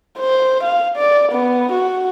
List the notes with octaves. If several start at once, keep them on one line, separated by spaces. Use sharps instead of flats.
C5
F5
D5
B3
F#4